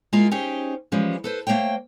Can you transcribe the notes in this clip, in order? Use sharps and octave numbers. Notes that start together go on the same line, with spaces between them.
G#3 A#3 E4 F4
C#4 D#4 G4 G#4 C5
E3 F3 G3 G#3 C#4
A4 B4 C5
A3 A#3 C5 C#5 G5